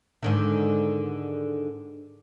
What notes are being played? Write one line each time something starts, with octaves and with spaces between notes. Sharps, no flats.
G#2 D3 D#3